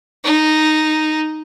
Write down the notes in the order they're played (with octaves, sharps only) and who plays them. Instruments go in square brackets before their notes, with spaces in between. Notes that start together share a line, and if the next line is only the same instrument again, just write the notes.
[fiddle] D#4